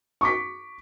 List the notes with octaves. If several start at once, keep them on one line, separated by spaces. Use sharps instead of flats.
C#6 D6 B6